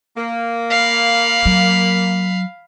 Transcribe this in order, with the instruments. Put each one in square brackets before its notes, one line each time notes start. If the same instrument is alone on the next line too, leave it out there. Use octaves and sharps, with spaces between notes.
[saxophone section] A#3
[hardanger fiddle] F5 B5
[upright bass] F#3